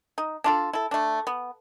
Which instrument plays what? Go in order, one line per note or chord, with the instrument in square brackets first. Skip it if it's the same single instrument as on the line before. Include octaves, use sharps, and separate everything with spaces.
[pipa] D#4
D4 F4 A4
E4 A4
A3 D4
B3